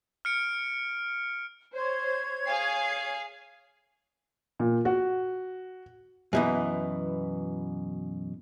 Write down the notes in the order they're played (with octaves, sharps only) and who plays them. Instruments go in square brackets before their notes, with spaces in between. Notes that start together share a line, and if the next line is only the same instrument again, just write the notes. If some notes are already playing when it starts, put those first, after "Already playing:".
[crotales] F6 C#7 D7
[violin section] C5 [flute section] C#5 G#6
[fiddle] G#4 F5 [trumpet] G#5 [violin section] C7
[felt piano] A#2
F#4
[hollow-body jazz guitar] F#2 B2 E3